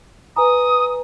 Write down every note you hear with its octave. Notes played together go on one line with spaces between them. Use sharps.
B4 G#5 A#5 D#6